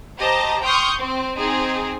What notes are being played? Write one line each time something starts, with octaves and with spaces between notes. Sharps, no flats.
G4 C5 D#5 A5 A#5
G5 C6 C#6 D#6 F6 G6
C4
C4 D#4 G#4